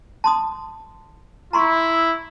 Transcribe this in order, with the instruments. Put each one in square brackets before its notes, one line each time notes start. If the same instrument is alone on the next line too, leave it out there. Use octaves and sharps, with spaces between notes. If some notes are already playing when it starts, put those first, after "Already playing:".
[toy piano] A5 C6 D#6
[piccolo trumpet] E4 [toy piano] A#5 C6 C#6